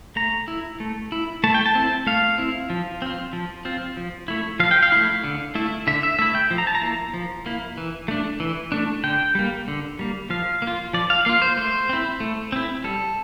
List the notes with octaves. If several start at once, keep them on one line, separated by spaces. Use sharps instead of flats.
A3 A#5
E4
A3
E4
A3 A5
G5
A5
C4 E4
A3 F5
C4 E4
F3
C4 F4
F3
C4 F4
F3
A3 E4
F3 F5
G5
F5
A3 E4
D3
A3 E4
D3 E5
E5
A3 E4 E5
G5
F3
A#5
A5
A#5
A#3 E4
F3
A#3 E4
E3
A3 D4
E3
A3 D4
D3 G5
G3 A#3
D3
G3 A#3
F3 F5
A#3
F4
F3 D5
F5
A#3 F4 F5
C5
A3 C5
C4 E4
A3
C4 E4
G3 A4